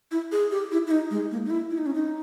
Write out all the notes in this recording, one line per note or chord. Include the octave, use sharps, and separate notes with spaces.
E4
G#4
G4
E4
E4
D#4
G#3
A#3
D#4
E4
E4
D#4
C#4
D#4